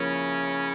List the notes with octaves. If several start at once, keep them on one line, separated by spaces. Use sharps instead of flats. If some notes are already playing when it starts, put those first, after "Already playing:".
Already playing: C#3 F3 A#3 C#4 E4